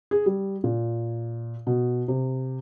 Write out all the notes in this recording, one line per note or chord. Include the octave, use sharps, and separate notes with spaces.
G#4
G3
A#2
B2
C3